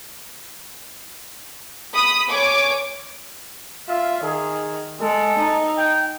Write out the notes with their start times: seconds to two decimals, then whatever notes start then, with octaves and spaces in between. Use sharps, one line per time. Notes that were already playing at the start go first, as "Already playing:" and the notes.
1.93 B5 D#6
2.31 C#5 G#5 D6
3.88 F4 E5
4.23 D#3 G#4
5.00 G#3 A4
5.38 D#4
5.78 G5